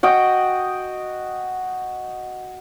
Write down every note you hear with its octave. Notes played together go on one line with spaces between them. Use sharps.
F#4 D#5 G5